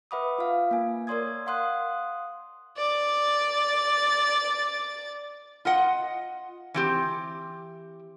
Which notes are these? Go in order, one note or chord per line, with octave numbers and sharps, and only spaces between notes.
B4 E5 F#5 B5 D6 D#6
F4 F5
A#3 G#5
A#4 C#5 D5 C6 D#6 G#6
F5 F#5 C6 D#6 F#6
D5 A6
F4 D#5 F#5
E3 C4 G4